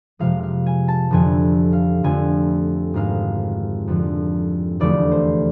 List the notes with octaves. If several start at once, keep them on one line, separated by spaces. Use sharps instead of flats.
F2 C3 F3 G#3 F5
F5
G#5
A5
F1 F2 D3 F3 G#5
F5
F2 D3 A3 G#5
G#1 G#2 G#3 F5
F2 D3 F3
F1 E2 D3 F3 A3 D5
C5